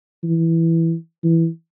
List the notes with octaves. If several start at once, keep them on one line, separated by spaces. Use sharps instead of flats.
E3
E3